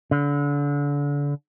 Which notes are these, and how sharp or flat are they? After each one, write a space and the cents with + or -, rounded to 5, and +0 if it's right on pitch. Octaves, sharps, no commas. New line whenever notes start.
D3 -30